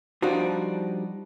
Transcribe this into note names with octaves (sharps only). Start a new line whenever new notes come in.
F3 G3 D4 D#4 F#4